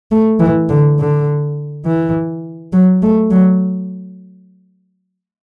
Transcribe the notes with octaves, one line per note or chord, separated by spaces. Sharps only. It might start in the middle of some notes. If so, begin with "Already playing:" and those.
A3
E3
D3
D3
E3
F#3
A3
F#3